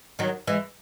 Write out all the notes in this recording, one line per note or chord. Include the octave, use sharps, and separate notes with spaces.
D#3 F#3
E3 G#3